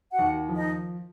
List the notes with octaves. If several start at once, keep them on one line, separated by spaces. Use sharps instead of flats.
F#4 F#5
D#2
F3
D#4 D#5